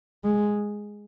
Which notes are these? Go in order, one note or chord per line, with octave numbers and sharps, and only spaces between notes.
G#3